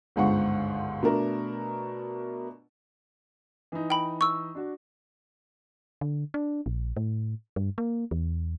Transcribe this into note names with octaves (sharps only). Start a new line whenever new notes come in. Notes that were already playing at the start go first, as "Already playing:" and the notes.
G1 C#2 G#2 D3 F#5 C#6
B2 A3 D4 A#4
E3 D#4
G5 B5
C#6 E6
D4 F#4
D3
D4
A#1
A2
G2
A#3
E2